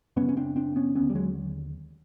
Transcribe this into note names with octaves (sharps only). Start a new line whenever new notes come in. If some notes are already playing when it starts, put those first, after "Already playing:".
F#2 C#3 B3 C#4
C#4
C4 D4
C4 D4
B3 C#4
D#2 D3 B3 C#4
G3
F#3 G#3